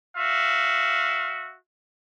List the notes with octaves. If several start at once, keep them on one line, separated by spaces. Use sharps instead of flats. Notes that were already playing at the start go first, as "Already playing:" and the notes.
F#4 E5 F5